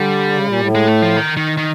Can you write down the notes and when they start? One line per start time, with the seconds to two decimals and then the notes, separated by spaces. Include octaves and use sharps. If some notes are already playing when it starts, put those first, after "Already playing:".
Already playing: D3 G3
0.32 C#3
0.46 A#2
0.60 A2
0.75 G#3
0.88 A3
1.02 F3
1.17 D#3
1.37 D#3
1.57 D#3